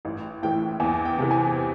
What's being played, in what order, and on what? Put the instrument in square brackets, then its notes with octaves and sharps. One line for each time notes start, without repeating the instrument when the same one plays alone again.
[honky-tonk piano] A1
[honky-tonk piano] A2 E3 [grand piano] G5
[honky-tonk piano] E2 [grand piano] G#5
[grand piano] G5
[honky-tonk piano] C3 E3
[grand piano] G#5